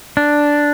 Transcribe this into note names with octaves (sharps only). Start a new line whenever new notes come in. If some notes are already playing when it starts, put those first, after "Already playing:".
D4